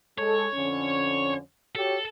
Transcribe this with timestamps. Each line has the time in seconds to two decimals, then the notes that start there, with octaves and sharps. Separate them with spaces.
0.18 G#3 A4 C#5
0.55 F2 D3 C#4
1.75 F#4 G4 A4 C#5